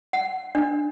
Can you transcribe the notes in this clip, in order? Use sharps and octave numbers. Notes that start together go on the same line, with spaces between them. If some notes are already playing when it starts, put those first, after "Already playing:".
F#5
D4